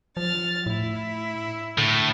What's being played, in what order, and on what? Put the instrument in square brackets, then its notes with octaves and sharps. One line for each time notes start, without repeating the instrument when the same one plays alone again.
[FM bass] F3 [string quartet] F6 A6
[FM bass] A2 [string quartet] E4
[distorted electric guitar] A2 [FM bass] D3